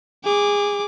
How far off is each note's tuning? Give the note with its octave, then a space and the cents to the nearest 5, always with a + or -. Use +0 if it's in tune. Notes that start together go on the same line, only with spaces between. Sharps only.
G#4 -20 D6 +0